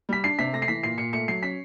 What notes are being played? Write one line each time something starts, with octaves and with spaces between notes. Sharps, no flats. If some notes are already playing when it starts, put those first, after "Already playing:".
G3 B6
D4 C7
C3 B6
A3 A#6
C7
E3 B6
A#2 C7
A#2 C#7
A3 C#7
F#3 C7
C#4 B6